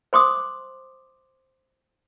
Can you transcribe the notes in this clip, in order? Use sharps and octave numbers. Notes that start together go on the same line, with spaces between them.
C5 C6 D6 D#6